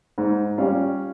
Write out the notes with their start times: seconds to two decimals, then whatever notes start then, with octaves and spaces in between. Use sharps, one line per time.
0.18 G#2
0.58 G3 C#4 F4